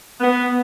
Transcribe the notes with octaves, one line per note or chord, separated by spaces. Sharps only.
B3